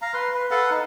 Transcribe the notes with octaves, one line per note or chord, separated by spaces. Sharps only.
F5 A#5
B4 C6
B4
A4 B4 F5 F#5
D#4